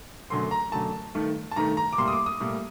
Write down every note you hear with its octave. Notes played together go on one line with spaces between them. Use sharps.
F#2 D3 F#3 A3 C6
A#5
F#2 D3 F#3 A3 A5
G2 D#3 A3
A5
G2 D#3 A3 A#5
A#5
D6
A2 G3 A#3 C6
D#6
D6
D#6
A2 G3 A#3